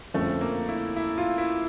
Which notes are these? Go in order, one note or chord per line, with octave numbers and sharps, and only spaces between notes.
F2 D3 F3 A3 C#4
A#3
E4
E4
F4
E4